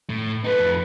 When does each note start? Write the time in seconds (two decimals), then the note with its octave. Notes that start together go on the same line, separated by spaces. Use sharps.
0.10 A2
0.44 D#4 A4 B4
0.60 F2